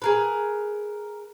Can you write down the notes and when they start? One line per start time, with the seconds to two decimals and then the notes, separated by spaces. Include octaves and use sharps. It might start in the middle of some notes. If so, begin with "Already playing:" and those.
0.02 G#4 A#4 B4